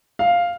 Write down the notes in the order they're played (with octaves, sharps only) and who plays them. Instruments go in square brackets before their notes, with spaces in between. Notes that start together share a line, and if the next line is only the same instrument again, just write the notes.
[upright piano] F5